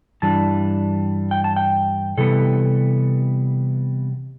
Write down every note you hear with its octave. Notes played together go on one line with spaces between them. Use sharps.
G2 E3 G3 D4 A5
G5
A5
G5
C3 E3 G3 B3 A4